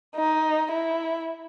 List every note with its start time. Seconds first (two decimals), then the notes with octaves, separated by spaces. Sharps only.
0.16 D#4
0.71 E4